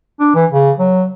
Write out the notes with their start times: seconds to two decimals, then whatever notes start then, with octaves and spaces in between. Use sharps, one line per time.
0.20 D4
0.35 E3
0.51 C#3
0.79 F#3